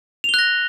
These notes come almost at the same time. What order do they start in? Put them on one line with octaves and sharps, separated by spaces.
F7 G7 F#6 A#6